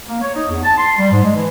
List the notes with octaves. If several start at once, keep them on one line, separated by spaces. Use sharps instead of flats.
A#3
C#5
D#4
E2
A5
C6
G3
G#2
G#3
E3